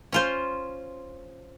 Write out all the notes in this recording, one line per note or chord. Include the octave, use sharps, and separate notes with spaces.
C#4 F4 C5